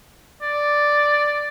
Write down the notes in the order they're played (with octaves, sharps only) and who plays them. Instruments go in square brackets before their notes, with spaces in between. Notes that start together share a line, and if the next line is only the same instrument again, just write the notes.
[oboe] D5